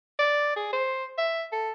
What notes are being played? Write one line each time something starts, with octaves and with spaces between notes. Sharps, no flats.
D5
G#4
C5
E5
A4